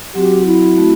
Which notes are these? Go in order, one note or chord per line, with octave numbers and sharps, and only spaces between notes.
F#3 C4 F#4 G4
E4
A3 C4 F#4